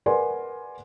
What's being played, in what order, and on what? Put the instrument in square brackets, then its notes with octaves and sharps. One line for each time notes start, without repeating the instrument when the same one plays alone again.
[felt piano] A#4 B4 D5 F#5 G#5 C6